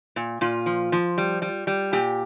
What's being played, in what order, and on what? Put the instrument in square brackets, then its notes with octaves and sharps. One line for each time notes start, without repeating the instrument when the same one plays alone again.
[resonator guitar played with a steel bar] A#2
A#2 F4
F3
F3
G3
G3
G3
A#2 G4